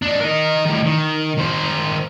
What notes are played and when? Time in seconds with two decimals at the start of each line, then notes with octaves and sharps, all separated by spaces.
0.03 D4 D#4
0.21 A#4 D#5
0.66 A2 D#3
0.86 D#3
1.38 D#3 C5